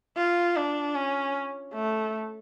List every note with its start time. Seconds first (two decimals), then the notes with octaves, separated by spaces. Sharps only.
0.17 F4
0.56 D4
0.95 C#4
1.74 A3